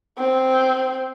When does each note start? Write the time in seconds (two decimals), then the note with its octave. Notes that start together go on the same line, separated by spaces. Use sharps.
0.18 C4